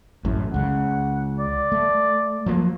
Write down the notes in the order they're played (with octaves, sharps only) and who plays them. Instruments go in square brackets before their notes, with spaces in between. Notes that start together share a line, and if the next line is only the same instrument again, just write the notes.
[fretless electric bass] A1 F#2 A2
[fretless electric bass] C#2 C#3 [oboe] F#5
[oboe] D5
[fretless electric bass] A3
F3 F#3 A#3